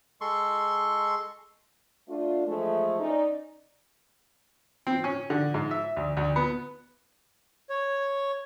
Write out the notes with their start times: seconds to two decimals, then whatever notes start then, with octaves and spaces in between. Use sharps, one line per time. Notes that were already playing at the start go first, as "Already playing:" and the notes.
0.21 G#3 A4 C6 C#6
2.09 A3 D4 F4
2.47 E3 F3 G#3 A3
3.00 C#4 D#4 D5
4.87 C4
5.04 C#4
5.30 D3
5.54 G#2
5.71 E5
5.96 D2
6.17 D2
6.36 B3
7.70 C#5